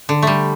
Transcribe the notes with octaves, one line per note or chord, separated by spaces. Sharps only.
D3
G3 A3